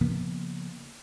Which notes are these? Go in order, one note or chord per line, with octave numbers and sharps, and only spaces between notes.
C#3 F3 A#3 B3